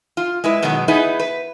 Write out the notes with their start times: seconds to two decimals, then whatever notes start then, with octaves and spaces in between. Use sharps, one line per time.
0.17 F4
0.44 G#3 E4 B4
0.62 B2 D#3 F#3 G#3 B3
0.88 B3 D#4 E4 G#4 B4
1.20 B4